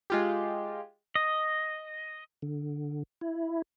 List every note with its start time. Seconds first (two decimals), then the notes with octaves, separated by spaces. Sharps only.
0.10 G#3 F4 G4
1.15 D#5
2.42 D3
3.21 E4